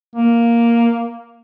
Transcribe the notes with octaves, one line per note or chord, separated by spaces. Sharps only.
A#3